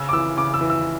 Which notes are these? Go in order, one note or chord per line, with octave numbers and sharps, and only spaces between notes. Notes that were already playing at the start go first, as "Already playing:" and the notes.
Already playing: C#3 E6
D6
E3 E6
C#3 D6
E6
E3
E6